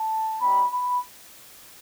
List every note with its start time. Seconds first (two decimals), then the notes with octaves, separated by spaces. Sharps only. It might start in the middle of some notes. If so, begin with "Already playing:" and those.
Already playing: A5
0.41 G3 C4 D#4 G4 B5
0.71 B5